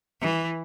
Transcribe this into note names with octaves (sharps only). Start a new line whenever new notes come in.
E3